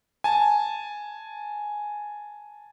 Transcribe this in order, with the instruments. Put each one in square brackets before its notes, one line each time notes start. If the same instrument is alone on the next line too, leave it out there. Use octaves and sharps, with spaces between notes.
[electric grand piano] G#5 A5